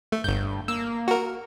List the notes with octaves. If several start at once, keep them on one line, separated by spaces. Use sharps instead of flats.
A3
G1 G2 G6
A#3 E6
F#4 A#4